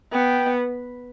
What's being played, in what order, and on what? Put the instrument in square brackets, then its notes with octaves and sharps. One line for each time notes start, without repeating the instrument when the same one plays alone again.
[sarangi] B3 [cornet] G5